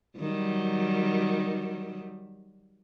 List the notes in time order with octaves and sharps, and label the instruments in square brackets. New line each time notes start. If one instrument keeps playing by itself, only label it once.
[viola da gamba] D#3 F#3 G3